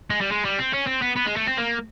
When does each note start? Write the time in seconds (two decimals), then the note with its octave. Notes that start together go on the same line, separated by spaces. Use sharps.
0.10 G#3
0.21 G3
0.32 G#3
0.45 G3
0.59 C4
0.74 C#4
0.87 C4
1.02 B3
1.16 B3
1.26 G#3
1.37 A3
1.47 C4
1.58 A#3